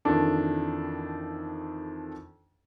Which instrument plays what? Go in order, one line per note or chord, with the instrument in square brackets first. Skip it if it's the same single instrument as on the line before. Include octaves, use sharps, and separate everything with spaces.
[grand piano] F2 D#3 E3 D4 A4